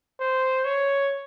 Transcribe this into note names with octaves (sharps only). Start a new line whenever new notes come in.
C5
C#5